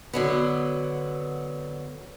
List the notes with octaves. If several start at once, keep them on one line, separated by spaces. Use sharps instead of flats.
D3 F#3 B3